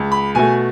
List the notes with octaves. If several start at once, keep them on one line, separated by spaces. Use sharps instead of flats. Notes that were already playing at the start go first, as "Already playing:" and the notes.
Already playing: C#2
B5
B2 A3 G#5